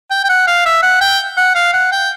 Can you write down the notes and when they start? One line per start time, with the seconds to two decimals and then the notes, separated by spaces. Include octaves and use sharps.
0.11 G5
0.24 G5
0.29 F#5
0.47 F5
0.65 E5
0.83 F#5
1.01 G5
1.37 F#5
1.55 F5
1.74 F#5
1.92 G5